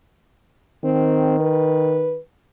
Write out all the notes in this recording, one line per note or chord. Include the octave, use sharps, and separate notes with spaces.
D#3 C4
B4